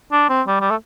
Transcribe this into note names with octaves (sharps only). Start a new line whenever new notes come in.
D4
C4
G3
G3
A3